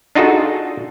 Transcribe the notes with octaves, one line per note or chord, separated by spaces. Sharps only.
D4 D#4 F4 F#4 G#4 A4